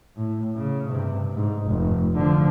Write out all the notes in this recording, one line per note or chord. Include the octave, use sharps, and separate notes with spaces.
A2
C#3
G2 C3
G#2
F1
D3 F3